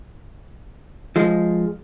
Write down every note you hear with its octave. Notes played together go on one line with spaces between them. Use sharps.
F3 G#3